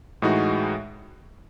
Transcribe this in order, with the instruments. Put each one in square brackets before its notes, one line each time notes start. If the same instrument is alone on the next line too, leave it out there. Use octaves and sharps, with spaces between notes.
[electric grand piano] A2 E3 G#3 D#4 F#4